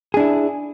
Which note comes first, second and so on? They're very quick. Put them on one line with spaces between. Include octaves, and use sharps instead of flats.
G#4 D4 E4